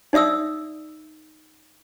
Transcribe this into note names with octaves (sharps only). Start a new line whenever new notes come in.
D#4 D5 E5 D#6 E6